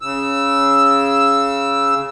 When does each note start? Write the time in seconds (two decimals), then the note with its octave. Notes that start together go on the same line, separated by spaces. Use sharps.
0.02 C#3 E6